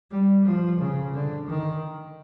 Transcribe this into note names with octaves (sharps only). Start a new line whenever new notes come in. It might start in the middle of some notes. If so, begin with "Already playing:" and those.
G3
F3
C#3
D3
D#3